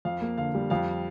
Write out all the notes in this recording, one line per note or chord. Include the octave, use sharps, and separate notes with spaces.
F2 F5
A#3
D3 F5
G3
F2 F5